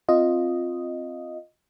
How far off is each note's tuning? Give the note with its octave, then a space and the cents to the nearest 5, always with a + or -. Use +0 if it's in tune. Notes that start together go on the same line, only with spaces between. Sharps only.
C4 +0 F4 +0 D#5 +0